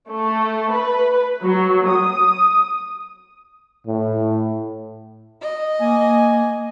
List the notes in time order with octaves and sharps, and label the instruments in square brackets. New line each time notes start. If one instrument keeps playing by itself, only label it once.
[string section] A3
B4
F#3
D#6
[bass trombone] A2
[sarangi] D#5
[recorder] A#3 [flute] G#5